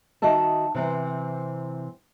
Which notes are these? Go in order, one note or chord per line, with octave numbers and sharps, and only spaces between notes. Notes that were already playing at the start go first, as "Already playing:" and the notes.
D#3 F#4 D#5 E5 A5
C3 E3 C4